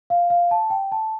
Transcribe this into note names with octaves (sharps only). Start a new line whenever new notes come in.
F5
F5
A5
G5
A5